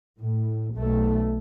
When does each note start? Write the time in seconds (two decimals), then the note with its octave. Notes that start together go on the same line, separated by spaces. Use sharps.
0.20 A2
0.75 B1 A3